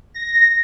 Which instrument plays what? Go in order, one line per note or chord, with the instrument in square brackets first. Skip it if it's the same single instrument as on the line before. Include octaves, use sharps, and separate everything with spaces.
[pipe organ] A#6